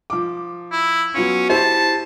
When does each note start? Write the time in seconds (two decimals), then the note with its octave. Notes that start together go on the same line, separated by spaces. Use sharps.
0.10 F3 D6
0.72 E4
1.15 F#3 B3 C#4 F4
1.50 E4 G4 C5 A5